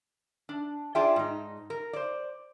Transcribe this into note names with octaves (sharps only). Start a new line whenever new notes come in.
D4
D4 F4 G#4 D5 E5 G5
G#2 D#4
A#4
C5 D5